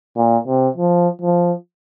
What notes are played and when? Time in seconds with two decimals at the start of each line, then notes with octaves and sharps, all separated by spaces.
0.17 A#2
0.48 C3
0.77 F3
1.22 F3